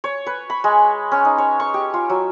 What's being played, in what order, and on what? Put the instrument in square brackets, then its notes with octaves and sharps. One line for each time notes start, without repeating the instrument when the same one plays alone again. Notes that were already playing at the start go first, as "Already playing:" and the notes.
[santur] C#5
B4
B5
G#3
C#4
D#4
C#5
C#6
G4
F4
F#3